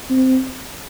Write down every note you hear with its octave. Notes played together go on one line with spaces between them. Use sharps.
C4